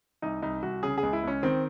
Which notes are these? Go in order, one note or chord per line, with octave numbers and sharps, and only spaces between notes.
C2 D#4
C2 D#4
C2 F#4
C#3 G#4
G#4
C#2
E4
C#2 C#4
D#3 C4